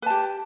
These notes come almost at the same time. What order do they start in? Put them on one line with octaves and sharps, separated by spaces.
B4 A5 G4